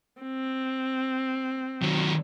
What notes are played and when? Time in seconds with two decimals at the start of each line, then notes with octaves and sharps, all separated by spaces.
0.21 C4
1.82 D#3 F#3